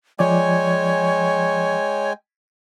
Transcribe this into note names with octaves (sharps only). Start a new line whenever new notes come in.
F3 G#3 C#5 D5 G5 G#5